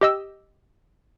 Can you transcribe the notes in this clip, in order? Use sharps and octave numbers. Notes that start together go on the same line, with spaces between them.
G4 D#5 E6